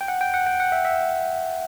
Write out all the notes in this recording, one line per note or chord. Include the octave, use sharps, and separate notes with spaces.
G5
F#5
G5
F#5
G5
F#5
E5
E5